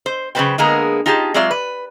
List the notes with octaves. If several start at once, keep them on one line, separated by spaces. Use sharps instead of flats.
C5
C#3 F#3 A3 B4 C5 G5
D3 G#3 A#3 B3 G#4 A#4
D#4 F4 G4 G#4 A5
F#3 G#3 C4 F4 D5 E5
B4